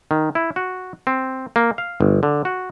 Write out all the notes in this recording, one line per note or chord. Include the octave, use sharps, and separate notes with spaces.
D#3
E4
F#4
C4
A#3
F5
G1
D3
F#4